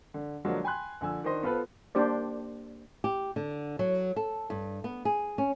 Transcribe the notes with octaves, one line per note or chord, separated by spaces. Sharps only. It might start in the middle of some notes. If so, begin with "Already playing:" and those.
D3
D3 F3 F#3 G#3 A#3
G5 G#5 B5 C6 F#6
A#1 D3 G#5 E6
D#3 D4 C5 D#5 C6
B3 F4 A4 B4 C5
A#3 D4 G4 C5 D5
G4
D3
F#3
A4
G2
B3
G#4
C#4